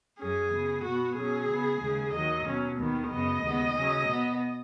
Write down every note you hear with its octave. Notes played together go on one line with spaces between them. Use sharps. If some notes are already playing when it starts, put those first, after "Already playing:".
F#2 F#3 C#4 G#4
C#3 B3
B2 B3 F#4
B2 F#3 C#4 G#4
C#3 B3
D#2 C#3 G#3
D#2 D#3 F#3 D#5
B2 F#3 C#4
D#2 D#3 B3
F#2 C#3 B3 D#5
D#2 C#3 G#3 B3
C#3 F#3 C#4
B2 B3